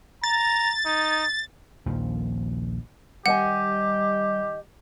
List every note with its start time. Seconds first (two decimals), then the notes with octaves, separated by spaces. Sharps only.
0.24 A#5 A6
0.86 D#4
1.86 A#1 D#2 F3
3.26 D#3 G3 G4 D#5 F#5 G#5